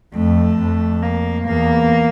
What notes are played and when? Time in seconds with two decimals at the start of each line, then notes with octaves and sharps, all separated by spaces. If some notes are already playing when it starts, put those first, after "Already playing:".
0.13 F2 A3
0.58 F2
1.02 A#3
1.47 E2 A#3